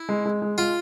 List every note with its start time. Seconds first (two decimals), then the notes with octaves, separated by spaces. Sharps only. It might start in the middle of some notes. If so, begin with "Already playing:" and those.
Already playing: E4
0.09 G#3
0.26 G#3
0.42 G#3
0.58 G#3 F4